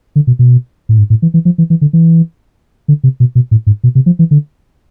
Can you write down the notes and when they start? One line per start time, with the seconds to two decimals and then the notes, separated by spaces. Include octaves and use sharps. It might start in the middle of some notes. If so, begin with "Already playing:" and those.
0.16 D3
0.27 B2
0.39 B2
0.89 A2
0.98 G#2
1.10 A2
1.22 E3
1.34 E3
1.45 F3
1.58 E3
1.70 E3
1.81 D3
1.93 E3
2.88 D3
3.04 C3
3.20 B2
3.35 B2
3.51 A2
3.67 G#2
3.84 B2
3.95 C3
4.06 F3
4.19 E3
4.31 D3